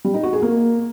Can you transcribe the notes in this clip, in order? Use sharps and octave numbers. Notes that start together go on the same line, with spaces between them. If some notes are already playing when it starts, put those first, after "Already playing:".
G3
D#4
F#4
G#4
A#3